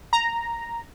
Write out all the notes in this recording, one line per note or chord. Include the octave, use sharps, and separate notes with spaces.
A#5